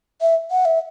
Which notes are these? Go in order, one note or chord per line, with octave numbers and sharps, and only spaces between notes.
E5
F#5
E5